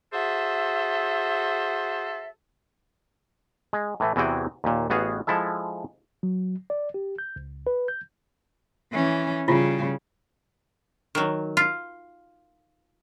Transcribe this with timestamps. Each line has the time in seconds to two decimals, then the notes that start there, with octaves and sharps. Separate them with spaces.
0.13 F#4 G#4 A4 C5 E5
3.73 G#3
4.00 A2 E3 A3
4.16 E2 C3 E3 F#4 G#4 G5
4.64 D#2 A#2
4.90 A1 B3 F#4 G#4 F5
5.27 F3 G#3 E4 A4 E5
6.23 F#3
6.70 D5
6.94 G4
7.18 G6
7.36 C#2
7.67 B4
7.88 G6
8.92 E3 C#4
9.48 C#3 G3 E4 F4
11.15 D#3 F#3
11.57 F4